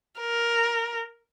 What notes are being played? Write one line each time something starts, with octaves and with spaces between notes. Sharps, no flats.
A#4